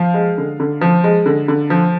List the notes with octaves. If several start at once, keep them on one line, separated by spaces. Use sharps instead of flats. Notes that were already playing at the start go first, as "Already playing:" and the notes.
Already playing: F3 F5
G#3
D3
D3
F3
G#3
D3
D3
F3